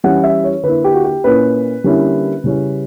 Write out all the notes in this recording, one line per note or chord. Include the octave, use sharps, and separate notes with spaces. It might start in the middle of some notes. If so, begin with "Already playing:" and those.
E3 G3 C#4 E4 F#5
E5
C#5
D3 A#3 E4 B4
G4
F#4
G4
A#2 A#3 C#4 E4 B4
D3 G3 A#3 C#4 E4
C#3 G3 C#4 E4